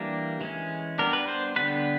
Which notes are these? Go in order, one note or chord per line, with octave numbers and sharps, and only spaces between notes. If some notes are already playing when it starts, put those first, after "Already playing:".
Already playing: E3 G3 A#3 D4 A#4
E3 G#3 C#4
G3 B3 D4 A#4
B4
C5
D3 G3 B3 D4 B4